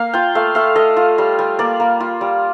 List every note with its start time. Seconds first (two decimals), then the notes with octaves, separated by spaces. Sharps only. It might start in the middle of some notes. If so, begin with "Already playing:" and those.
Already playing: A#3 F5
0.14 F4 G5
0.35 A3 F5
0.55 A3 F5
0.76 A3 D#5
0.97 F4
1.18 G3
1.39 G3
1.59 A#3 D5
1.80 A#3
2.00 F4
2.21 G3